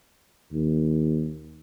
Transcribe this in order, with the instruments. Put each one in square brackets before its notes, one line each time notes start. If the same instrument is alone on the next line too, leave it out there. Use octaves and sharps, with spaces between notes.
[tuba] D#2